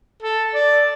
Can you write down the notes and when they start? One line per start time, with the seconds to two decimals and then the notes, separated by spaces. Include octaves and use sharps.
0.22 A4
0.54 D5